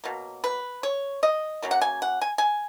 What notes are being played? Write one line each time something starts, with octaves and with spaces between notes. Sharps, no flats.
B2 F#3 A#3
B4
C#5
D#5
C#3 F#3 A#3
F#5
G#5
F#5
G#5
G#5